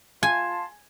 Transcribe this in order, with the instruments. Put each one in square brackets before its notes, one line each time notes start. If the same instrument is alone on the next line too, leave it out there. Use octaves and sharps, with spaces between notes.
[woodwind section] F4 A5 C6 [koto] G#5